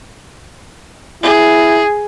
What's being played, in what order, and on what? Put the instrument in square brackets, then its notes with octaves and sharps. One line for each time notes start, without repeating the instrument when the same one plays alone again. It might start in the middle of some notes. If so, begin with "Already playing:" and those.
[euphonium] E4 [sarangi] G#4